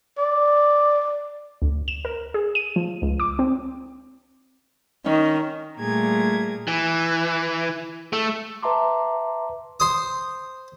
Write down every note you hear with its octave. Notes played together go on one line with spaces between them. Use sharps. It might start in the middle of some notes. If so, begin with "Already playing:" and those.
D5
D2
E7
A#4
G#4
D#7
F3
C#2
D6
C4
D#3 C#4
A#2 G3 A3 G#4 A#4 G#6
E3
A3
B4 E5 A5 A#5 C6 D6
C5 D#6